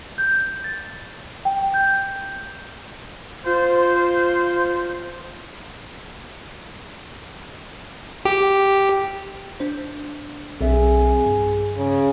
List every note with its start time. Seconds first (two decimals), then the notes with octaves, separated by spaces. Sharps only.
0.18 G6
0.64 A6
1.45 G5
1.74 G6
3.45 F4 C5
8.25 G4
9.60 D4 C5
10.61 B1 C4 G#4 E5
11.26 G2
11.77 C#3